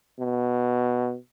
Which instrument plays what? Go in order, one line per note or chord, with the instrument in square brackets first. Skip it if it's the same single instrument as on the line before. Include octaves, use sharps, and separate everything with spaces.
[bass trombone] B2